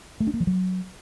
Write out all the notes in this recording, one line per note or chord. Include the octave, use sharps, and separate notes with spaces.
A3
D4
A#3
F3
F#3